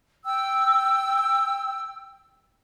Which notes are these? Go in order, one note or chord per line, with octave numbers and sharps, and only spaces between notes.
G5 E6